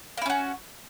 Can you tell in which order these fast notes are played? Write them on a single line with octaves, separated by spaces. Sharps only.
A#3 E4 C#4 F#4